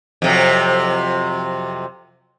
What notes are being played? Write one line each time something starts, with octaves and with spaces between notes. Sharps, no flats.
F2 C3 F#3